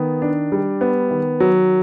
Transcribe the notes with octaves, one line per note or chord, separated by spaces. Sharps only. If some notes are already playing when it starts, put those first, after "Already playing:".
Already playing: D#3 B3
D4
G3
B3
D#3
F#3